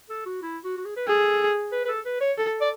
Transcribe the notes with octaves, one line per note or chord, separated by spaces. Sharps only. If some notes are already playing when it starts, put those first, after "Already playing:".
A4
F#4
E4
F#4
F#4
G#4
B4
G#4 A4
B4
B4
A4
B4
C#5
A4
D5